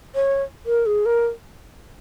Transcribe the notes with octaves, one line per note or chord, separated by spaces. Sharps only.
C#5
A#4
G#4
A#4